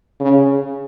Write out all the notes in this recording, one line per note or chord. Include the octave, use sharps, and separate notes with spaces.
C#3